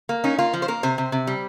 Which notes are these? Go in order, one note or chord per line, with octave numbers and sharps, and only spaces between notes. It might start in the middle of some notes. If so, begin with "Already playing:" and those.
A#3
C#4 D#4
A#3 F4
F3
C5
A#3 A#4
C3 C5
C3
C3
G3